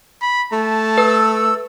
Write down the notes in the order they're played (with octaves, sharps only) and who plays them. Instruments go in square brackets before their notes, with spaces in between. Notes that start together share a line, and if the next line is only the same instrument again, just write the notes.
[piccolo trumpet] B5
[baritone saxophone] A3 [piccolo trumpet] A5
[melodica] A4 E6 [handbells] B4